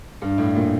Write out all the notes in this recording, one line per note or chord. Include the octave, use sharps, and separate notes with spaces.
G2
A2
A#2